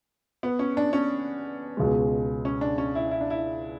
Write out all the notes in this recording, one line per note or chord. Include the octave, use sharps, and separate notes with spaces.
B3
C#4
D4
C#4
C#2 B2 G#3
C#4
D4
C#4
E4
E4
D4
E4